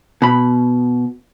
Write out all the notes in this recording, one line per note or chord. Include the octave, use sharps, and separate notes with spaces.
B2 B5